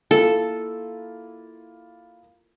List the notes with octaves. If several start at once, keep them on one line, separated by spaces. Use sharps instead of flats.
A#3 E4 F4 A4